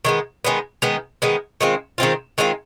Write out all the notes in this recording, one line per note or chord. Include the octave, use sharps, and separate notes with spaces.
D#3 G#3 B3
D#3 G#3 B3
D#3 G#3 B3
D#3 G#3 B3
D#3 G#3 C4 F4
D#3 G#3 C4 F4
D#3 G#3 C4 F4